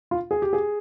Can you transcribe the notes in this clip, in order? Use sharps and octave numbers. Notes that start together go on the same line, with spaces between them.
F4
G#4
G4
G#4